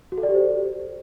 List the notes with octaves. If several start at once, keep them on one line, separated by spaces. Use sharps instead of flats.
F#4
A4
D5
G4
C5